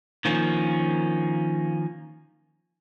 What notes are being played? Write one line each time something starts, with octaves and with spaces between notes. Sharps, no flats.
D#3 F3 A#3 C#4